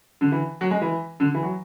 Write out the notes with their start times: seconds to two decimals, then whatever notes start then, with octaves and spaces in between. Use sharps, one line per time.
0.21 D3
0.32 E3
0.61 F#3
0.71 G#3
0.82 E3
1.20 D3
1.34 E3
1.43 F#3